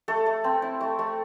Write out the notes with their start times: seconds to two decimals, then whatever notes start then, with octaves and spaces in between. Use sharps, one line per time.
0.08 A3 A4
0.26 A3
0.44 C4
0.62 E4
0.81 A3
0.99 A3